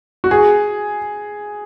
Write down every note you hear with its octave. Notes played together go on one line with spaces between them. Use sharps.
F#4
G#4